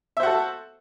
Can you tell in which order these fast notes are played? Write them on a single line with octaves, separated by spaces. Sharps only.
E5 C5 F#4 A4